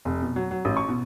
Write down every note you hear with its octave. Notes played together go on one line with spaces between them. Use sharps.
F1
B2
F#3
F#3
A1
C#6
B2